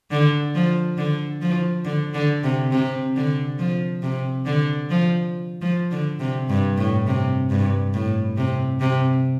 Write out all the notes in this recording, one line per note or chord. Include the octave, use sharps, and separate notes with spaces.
D3
F3
D3
F3
D3
D3
C3
C3
D3
F3
C3
D3
F3
F3
D3
C3
G2
A2
C3
G2
A2
C3
C3